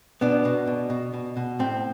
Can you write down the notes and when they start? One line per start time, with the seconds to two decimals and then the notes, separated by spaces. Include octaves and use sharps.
0.21 B2 B3 D4
0.45 B2
0.67 B2
0.90 B2
1.14 B2
1.37 B2
1.59 A2 C4